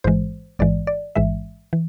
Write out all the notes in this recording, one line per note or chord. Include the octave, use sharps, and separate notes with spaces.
A1 G#2 E3 G#3 C5
A1 G#2 E3 G#3 D5
D5
A1 G#2 E3 G#3 E5
E3